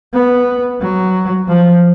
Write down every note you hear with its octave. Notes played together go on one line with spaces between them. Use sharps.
B3
F#3
F3